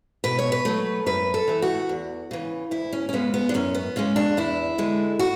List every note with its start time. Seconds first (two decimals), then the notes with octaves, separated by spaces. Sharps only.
0.24 B2 B4
0.39 C#5
0.52 B4
0.65 F#3 A3
1.06 F#2 B4
1.34 A4
1.48 E3 A3
1.62 F#4
1.89 E2
2.31 C#3 E3
2.71 D2 E4
2.93 C#4
3.09 C#4
3.13 C#3 G#3 B3
3.34 B3
3.49 D4
3.54 F#2 C#4
3.74 B3
3.96 C#3 G#3 C#4
4.16 D4
4.37 E2 E4
4.78 D3 G#3
5.19 F#4